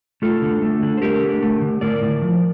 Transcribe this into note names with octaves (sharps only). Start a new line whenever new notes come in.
A3 F4 A4
D3
A3
D3
C5
A3 G4 A#4
D3
A3
D3
A2 A#4 D5
A2
F3